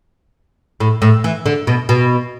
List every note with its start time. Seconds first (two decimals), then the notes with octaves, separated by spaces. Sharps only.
0.80 A2
1.02 A2
1.24 E3
1.46 D3
1.67 B2
1.89 B2